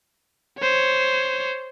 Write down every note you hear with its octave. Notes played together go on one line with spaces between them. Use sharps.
C5 C#5